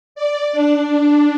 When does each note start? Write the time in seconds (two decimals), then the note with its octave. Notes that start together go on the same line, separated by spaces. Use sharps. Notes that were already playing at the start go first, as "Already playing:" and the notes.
0.15 D5
0.52 D4